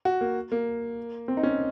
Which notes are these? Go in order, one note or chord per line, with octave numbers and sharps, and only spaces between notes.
F#4
A#3
A#3
C4
D#4
C#4